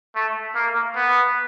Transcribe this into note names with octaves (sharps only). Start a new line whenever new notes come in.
A3
A#3
B3